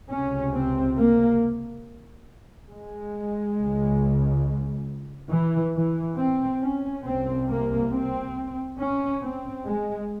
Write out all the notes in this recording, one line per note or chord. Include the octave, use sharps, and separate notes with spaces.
C#2 C3 C#4
C4
A#3
G#3
C#2 C#3
E3
E3
C4
C#4
C2 C3 C4
A#3
C4
C#4
C4
G#3